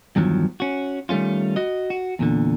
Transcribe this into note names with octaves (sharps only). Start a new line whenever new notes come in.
E2 G2 D#3 F3 F#3
C#4 F#4
D#3 G3 A3 C#4 F4
F#4 D#5
F#4
E2 A#2 D3